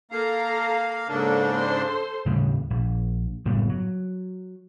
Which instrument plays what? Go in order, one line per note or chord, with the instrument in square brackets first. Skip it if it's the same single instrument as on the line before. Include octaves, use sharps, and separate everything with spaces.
[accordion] A#3 F5 [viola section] A4 A#5
[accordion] G#2 C#3 D4 [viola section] A#3 A4
[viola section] A4 C5 C6
[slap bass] D#2 A2 C#3 G3
A#1
F#1 A2 G3 B3
F#3